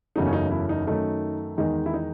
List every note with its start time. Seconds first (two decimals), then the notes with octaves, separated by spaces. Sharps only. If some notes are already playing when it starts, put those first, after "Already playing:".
0.16 F#1 E2 C#3 F#3 A3 D#4
0.27 C#4
0.33 D#4
0.51 E4
0.69 D#4
0.87 F#2 D#3 A3 D#4
1.57 E2 D#3 G#3 D#4
1.86 E4
1.94 D#4